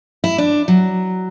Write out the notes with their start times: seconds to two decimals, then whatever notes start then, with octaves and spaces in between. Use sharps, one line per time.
0.24 E4
0.38 D4
0.68 F#3